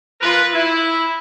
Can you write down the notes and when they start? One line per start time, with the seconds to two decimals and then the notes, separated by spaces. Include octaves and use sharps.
0.21 F3 F4 A#4 B4
0.53 E4